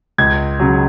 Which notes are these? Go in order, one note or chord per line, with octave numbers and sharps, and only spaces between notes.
C#2 G#6
C#3 F#3